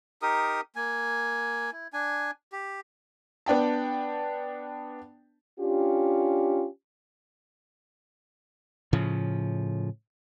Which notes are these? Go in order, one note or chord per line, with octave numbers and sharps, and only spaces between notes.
D#4 G4 A#4 D#6
A#3 G#5
E4
D4 G#5
G4
B3 D4 G5 A5
C#4 D4 F4 G4
A2 C#3 F3